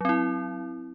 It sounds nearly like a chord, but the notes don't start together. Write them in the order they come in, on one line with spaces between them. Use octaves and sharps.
F#3 C4 E4